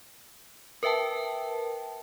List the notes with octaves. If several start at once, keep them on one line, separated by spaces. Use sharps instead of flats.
A#4 B4 E5 G5 A5